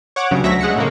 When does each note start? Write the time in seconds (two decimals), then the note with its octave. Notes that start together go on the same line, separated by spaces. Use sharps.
0.16 C#5 F#5 D6
0.31 G2 C#3 F#3
0.44 D2 F#3 E5 A#6 B6
0.61 G#3 F#5 A#6 C#7
0.76 A2 C#3 A#3